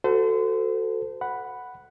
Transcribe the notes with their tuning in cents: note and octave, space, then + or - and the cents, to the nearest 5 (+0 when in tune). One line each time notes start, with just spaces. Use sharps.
F#4 +0 A4 +15 C5 -35
F#5 +0 B5 +0